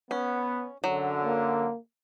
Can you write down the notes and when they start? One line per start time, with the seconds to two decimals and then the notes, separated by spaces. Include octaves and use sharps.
0.11 B3 C#4
0.84 F#2 D3 F#3
1.25 A#3